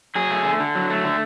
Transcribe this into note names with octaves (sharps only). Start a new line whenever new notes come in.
F#3 G#4
A3
D3
D3
F#3
A3
D3